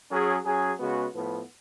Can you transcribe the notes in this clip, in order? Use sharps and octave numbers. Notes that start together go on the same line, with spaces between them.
F#3 C#4 G#4
F#3 C#4 G#4
C#3 G#3 B3 F#4
A2 F3 B3